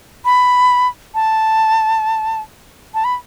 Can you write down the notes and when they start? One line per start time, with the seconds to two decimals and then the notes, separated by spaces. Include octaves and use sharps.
0.25 B5
1.15 A5
2.94 A5
3.04 B5